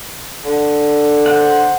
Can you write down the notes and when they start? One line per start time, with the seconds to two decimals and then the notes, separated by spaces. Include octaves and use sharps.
0.44 D3
1.26 C5 F#5